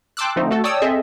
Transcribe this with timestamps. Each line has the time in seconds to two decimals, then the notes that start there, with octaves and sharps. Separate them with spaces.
0.17 G5 A5 C6 D6 E6 F#6
0.36 D3 F3 A3 C4 D#4
0.51 A3 F#4 A4
0.64 C#5 D5 G5 A5 D#6 E6
0.82 C4 G#4 A4 D#5 E5